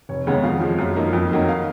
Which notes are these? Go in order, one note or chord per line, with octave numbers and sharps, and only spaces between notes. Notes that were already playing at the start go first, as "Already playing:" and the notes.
F1 C#5
D#2 C#3 G#3 B3 C#5
F2 F5
F3 G#3
F#2
F3 A#3 D#4
F2
D#3 F#3 A#3 D#4
F5